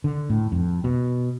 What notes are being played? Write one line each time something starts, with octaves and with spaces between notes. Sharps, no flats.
D3
A2
F2
B2